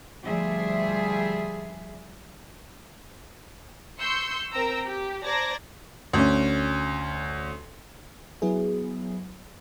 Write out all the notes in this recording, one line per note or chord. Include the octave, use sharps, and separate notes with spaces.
D2 F3 G3 G#4 E5
C6 C#6 E6 G6 C#7
C4 A#4 G5 A#5 E6
G4
C5 D5 A5 A#5 G#6 A#6
D2 C#4
F#3 B3 E4 G#4